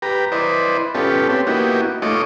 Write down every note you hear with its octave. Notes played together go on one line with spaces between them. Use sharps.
G4 B4 A#5
E4 B4 C5 D5 D#5
B3 C#4 F4 G4 A4
C4 G4 B4
A#3 B3 D#4 E4 F#4 G4
A3 D#4 F4 C#5 D#5 D6